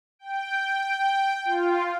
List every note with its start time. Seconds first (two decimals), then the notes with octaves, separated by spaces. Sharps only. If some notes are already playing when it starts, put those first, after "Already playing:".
0.19 G5
1.45 F4